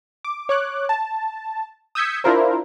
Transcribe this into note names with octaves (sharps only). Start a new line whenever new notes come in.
D6
C#5 D6 F#6
A5
D#6 E6 G6 G#6 B6 C#7
D4 E4 F4 A#4 C5